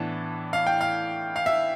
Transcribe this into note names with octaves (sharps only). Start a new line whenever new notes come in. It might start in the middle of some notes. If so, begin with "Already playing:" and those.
Already playing: A2 E3 B3 D4 A5
F5
G5
F5
F5
E5